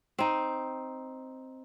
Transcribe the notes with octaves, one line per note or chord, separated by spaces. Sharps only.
C4 D#4